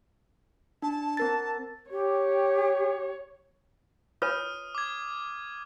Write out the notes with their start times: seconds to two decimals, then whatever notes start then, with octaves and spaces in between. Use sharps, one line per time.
0.82 D4 A5
1.17 C4 A#4 A6
1.90 G4 C#5
4.22 F4 B4 C#5 D#6 F6 D#7
4.75 D6 G#6